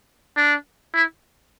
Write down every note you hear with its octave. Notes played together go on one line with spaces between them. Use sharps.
D4
E4